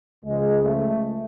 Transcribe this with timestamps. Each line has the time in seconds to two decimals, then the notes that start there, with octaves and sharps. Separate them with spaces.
0.24 C#2 C#3 F3 G#3
0.64 A3